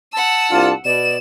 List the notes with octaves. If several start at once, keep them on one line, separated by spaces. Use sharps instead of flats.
F#5 A5 E6
C2 D4 F4
B2 D5 E7